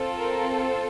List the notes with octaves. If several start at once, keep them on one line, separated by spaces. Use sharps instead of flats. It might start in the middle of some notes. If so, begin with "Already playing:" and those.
Already playing: C4 F4 A4
A#4